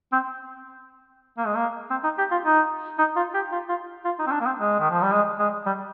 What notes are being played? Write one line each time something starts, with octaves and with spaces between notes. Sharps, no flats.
C4
A#3
G#3
A#3
C4
D#4
G4
F4
D#4
D#4
F4
G4
F4
F4
F4
D#4
C4
D4
A#3
C4
G#3
D#3
F3
G3
G#3
G#3
G3